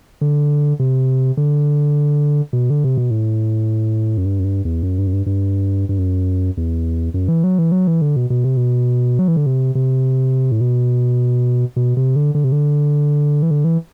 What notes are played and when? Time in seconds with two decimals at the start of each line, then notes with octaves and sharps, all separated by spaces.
0.21 D3
0.79 C3
1.37 D3
2.53 B2
2.70 D3
2.84 C3
2.97 B2
3.11 A2
4.17 F#2
4.25 G2
4.39 F#2
4.44 G2
4.65 E2
4.83 F#2
4.98 G2
5.07 F#2
5.13 G2
5.26 G2
5.89 G2
5.98 F#2
6.57 E2
7.14 F#2
7.28 E3
7.44 F#3
7.58 E3
7.72 F#3
7.87 E3
8.02 D3
8.16 B2
8.30 B2
8.44 C3
8.57 B2
9.19 F#3
9.28 E3
9.36 D3
9.46 C3
9.75 C3
10.52 A2
10.61 B2
11.76 B2
11.97 C3
12.16 D3
12.35 D3
12.44 C3
12.52 D3
13.42 E3
13.51 D3
13.64 E3